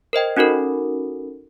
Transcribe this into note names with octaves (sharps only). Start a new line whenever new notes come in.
A#4 C5 D#5 G5
C#4 D#4 F#4 A4 A#4